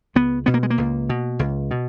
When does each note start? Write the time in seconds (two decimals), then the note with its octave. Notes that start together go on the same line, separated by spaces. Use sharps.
0.15 C#2 B3
0.46 B2 B3
0.54 A#3
0.63 G#3
0.70 A#3
0.78 C#2
1.09 B2
1.39 C#2
1.71 B2